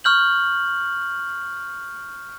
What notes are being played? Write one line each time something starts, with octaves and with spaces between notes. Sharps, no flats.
C#6 F6 G6 F#7